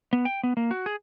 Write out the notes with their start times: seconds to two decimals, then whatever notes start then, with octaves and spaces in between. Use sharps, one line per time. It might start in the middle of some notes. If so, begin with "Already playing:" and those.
0.13 B3
0.25 G5
0.43 B3
0.57 A#3
0.71 F#4
0.86 G#4